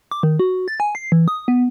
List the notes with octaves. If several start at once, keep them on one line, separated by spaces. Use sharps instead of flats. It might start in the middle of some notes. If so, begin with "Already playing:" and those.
D6
D#3
F#4
A6
G#5
C7
E3
D#6
B3